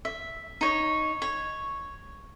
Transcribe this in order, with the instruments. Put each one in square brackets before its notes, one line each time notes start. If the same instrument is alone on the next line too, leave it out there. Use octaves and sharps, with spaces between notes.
[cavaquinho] E5
D#4 C#5
C#5